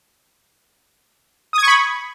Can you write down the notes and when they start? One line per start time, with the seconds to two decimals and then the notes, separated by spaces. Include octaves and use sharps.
1.53 D#6
1.58 G#6
1.63 C#6
1.67 B5